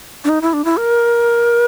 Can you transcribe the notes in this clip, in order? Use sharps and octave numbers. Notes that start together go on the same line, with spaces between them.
D4
D#4
E4
D4
E4
A#4